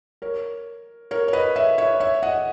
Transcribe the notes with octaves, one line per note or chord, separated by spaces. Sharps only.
A#4 C#5
A#4 C#5
C#5
B4 D#5
C#5 E5
C#5 E5
C#5 E5
D#5 F#5